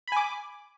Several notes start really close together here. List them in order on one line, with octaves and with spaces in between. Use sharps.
B5 G#5 D6